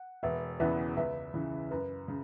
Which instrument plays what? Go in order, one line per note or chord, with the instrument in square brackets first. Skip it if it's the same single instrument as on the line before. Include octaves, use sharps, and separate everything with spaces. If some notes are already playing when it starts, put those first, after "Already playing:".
Already playing: [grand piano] F#5
[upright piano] E1 [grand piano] B4 E5
[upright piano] E2 C#3 E3 B3 [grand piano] B4 E5
[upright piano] C#2 [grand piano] B4 E5
[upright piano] C#3 E3
[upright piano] F#2 [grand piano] B4
[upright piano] C#3